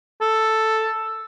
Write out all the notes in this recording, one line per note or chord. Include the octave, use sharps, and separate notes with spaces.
A4